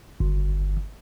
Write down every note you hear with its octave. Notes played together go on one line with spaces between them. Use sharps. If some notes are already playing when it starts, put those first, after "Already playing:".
G1